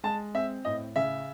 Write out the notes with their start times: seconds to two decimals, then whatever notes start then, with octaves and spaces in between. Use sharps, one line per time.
0.03 G#3 A5
0.34 C4 E5
0.65 A2 D#5
0.96 C#3 E5